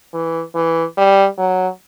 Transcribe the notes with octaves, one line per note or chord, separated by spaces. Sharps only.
E3
E3
G3
F#3